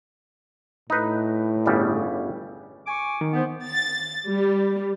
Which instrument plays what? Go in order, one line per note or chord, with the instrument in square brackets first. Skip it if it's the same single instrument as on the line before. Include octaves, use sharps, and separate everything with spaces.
[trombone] A2 [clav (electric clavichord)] D#4 B4
[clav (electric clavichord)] G1 C#3 G3
[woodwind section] G#5 C#6 D6
[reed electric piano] D#3
[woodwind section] B3 C5
[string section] A6
G3